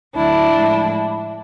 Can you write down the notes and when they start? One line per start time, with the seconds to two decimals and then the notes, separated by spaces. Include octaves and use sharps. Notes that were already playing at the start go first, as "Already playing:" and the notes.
0.15 D2 D3 F#3 D4 E4
0.53 A2 F3 G#3